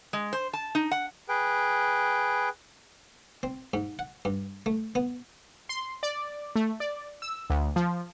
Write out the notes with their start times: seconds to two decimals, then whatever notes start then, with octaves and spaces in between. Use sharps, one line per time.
0.13 G#3
0.33 C5
0.53 A5
0.75 D#4
0.91 F#5
1.29 G#4 B4 G5
3.43 C4
3.74 G#2
3.99 F#5
4.25 G2
4.66 A3
4.95 B3
5.69 C6
6.03 D5
6.56 A3
6.80 D5
7.22 E6
7.50 D2
7.76 F3